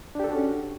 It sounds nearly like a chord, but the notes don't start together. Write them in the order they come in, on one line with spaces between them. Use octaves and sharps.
D4 G4 A4 F#4 C#4